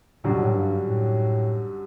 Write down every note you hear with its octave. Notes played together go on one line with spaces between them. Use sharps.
F#2 A2 D3 G3 C#4 F#4
B2
A2
G2
A2